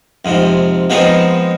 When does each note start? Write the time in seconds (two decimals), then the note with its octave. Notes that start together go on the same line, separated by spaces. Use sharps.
0.25 F2 G#2 C3
0.90 F3 G#3 B3 C4 D#4